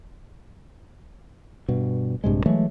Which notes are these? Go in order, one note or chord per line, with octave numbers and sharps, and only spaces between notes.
G2 B2
A#1 G2 C3 G#3
E3 F#3 G#3 A3